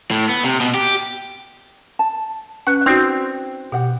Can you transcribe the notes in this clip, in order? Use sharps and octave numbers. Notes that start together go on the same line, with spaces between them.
A2
B3
C3
B2
G4
A5
C#4 B4 F#5
C4 D#4 F#4 D5
B2 G4 F#5